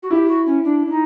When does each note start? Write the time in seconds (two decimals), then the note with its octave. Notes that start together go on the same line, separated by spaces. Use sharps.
0.03 F#4
0.10 E4 G4
0.28 F#4
0.46 C#4
0.64 D4
0.86 D4
0.90 D#4